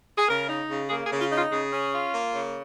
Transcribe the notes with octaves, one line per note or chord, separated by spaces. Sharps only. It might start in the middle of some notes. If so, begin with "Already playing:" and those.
G#4
C#3 A#4
D#4
C#3
A#3 G#4
G#4
C#3
F4
D#4
F4
C#3 G#4
C#4
F4
A#3
C#3